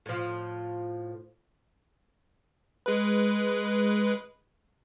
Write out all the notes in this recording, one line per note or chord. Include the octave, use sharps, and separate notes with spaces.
A2 F3
G#3 B4